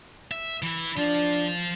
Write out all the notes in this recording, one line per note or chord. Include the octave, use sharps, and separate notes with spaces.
E5
E3 E4
F3 D4 F4